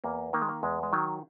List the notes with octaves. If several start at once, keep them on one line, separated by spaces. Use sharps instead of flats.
E2 A#3
D#3 A#3
G#3
A#3
E2 G#3
G#3
D#3 F#3